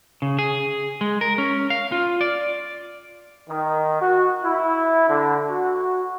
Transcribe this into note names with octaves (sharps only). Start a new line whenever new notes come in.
C#3
G#4
G#3
A#4
C#4
F5
F4
D5
D#3
F#4
E4
D3
F#4